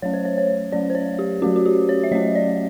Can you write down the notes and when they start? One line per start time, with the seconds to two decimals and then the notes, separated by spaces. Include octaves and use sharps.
0.02 F#3 A3 C#4 C#5
0.14 C5
0.25 C#5
0.38 C#5
0.72 F#3 A3 C#4 D5
0.90 C5
0.95 C#5
1.19 G4
1.42 F#3 A3 C#4 F#4
1.56 F#4
1.66 G4
1.89 C#5
2.04 E5
2.11 F#3 A3 C#4 D#5
2.35 D5